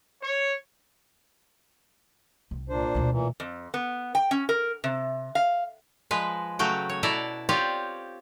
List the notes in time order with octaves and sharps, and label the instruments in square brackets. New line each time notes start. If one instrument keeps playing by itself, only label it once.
[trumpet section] C#5
[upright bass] C2
[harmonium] A#2 D4 C5
[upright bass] D2 B2
[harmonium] A#2 E3
[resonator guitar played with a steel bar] F2
B3
G5
C#4
A#4
C3
F5
[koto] F3 G#3 B4
C#3 F#3 A3 F#4 G5
C#5
B2 E4 A4 D5 E5 A#5
C4 F4 G4 C#5 D5